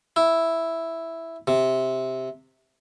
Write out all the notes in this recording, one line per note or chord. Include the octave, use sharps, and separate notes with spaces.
E4
C3